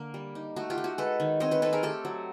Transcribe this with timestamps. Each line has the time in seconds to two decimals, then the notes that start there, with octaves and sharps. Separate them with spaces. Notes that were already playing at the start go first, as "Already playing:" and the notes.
Already playing: D3 A#3
0.14 G3
0.35 D#4
0.56 A3 F#4
0.70 F4 G4
0.78 A3
0.84 F#4
0.98 G#3 A4 B4
1.20 D#3
1.40 C4 C#5 D#5
1.51 B4 C#5
1.62 C4 A4 B4
1.73 G#4 A#4
1.83 A3 G4 A4
2.05 F#3